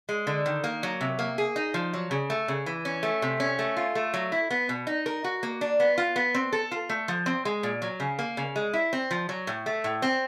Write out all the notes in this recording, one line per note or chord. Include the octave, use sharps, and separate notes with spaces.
G#3
D3
D#3
A#3
F#3
C3
A#3
G#4
D#4
F3
F#3
C#3
A3
C#3
E3
C#4
A3
C3
C#4
A3
F4
A3
F#3
E4
B3
B2
D#4
A#4
F#4
A#3
D4
B3
F4
B3
C4
A4
F4
A3
F3
C4
G#3
A#2
F#3
C#3
A#3
C#3
G#3
E4
C4
F3
F#3
A2
A3
A2
C4